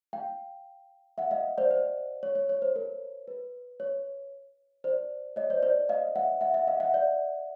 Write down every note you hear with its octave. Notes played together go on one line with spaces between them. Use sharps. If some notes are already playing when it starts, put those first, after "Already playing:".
F5 G5
E5 F#5
D#5 F5
C5 D5
C5
C#5
C#5
C#5
C5
A#4
B4
C#5
C5 D5
C#5 D#5
C5 D5
C5 D5
D#5 F5
E5 F#5
E5 F#5
E5 F#5
D#5 F5
E5 F#5
D5 E5